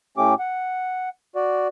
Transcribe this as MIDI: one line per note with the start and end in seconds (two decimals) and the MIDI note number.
0.18 0.34 45
0.18 0.34 57
0.18 0.34 61
0.18 0.34 67
0.18 0.34 86
0.39 1.09 78
1.36 1.68 66
1.36 1.68 74